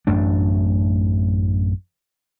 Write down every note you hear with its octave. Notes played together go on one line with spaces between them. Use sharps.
A1 F#2 A3 D4